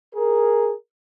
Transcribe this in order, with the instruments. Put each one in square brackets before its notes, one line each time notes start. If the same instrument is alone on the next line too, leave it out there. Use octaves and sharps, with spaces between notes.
[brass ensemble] G#4 A#4